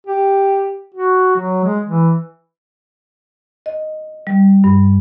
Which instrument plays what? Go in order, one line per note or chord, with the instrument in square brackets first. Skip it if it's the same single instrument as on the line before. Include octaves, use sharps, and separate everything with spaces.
[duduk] G4
F#4
F#3
G#3
E3
[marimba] D#5
G3
G2